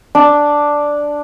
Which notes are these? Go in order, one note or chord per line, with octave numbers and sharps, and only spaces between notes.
D4